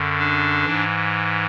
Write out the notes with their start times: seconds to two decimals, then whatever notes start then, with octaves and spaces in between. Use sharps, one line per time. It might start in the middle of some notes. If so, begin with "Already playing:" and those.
Already playing: F#2 D3
0.19 D4
0.65 G#2 E3